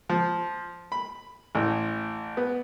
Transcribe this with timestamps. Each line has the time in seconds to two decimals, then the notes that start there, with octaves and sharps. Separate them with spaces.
0.09 F3
0.92 B5
1.55 A1
2.37 B3